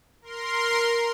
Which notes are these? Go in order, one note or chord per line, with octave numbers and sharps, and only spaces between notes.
A#4 C6